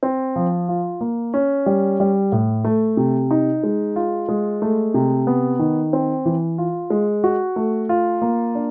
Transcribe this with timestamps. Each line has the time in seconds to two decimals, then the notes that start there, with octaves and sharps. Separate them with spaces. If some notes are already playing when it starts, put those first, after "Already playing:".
0.03 C4
0.36 F3
0.69 F4
1.01 A#3
1.34 C#4
1.66 G3
2.00 G3
2.32 A2
2.65 A3
2.97 C3
3.31 D#4
3.64 G#3
3.96 F4
4.29 G#3
4.62 A3
4.94 C3
5.27 B3
5.59 D#3
5.93 C4
6.26 E3
6.58 F4
6.90 G#3
7.24 F#4
7.56 A3
7.89 F4
8.22 A#3
8.55 D4